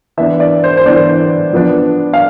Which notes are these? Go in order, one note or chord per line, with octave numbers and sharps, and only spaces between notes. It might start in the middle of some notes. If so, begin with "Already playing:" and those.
E3 B3 D4 E5
D5
C5
C5
E3 B3 D4 D5
F3 B3 D4
F5